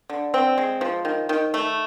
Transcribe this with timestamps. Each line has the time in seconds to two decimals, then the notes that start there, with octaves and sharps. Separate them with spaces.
0.09 D3
0.34 C4
0.58 G#3
0.81 F3
1.05 D#3
1.29 D#3
1.54 A3